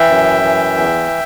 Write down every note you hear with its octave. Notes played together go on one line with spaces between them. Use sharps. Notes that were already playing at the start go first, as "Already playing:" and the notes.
Already playing: E3 E5 G5
F#2
E3
E2